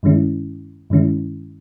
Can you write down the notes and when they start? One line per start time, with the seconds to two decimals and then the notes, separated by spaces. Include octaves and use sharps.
0.03 G2 D#3 G#3 C#4 E4
0.90 G2 D#3 G#3 C#4 E4